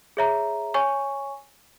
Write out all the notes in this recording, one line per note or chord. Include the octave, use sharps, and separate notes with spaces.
G#4 C#5 E5 A#5
C#5 G#5 C#6